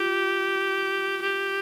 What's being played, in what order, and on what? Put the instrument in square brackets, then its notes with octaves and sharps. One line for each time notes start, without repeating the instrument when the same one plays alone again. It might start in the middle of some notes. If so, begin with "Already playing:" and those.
Already playing: [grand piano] F4 [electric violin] G4
[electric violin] G4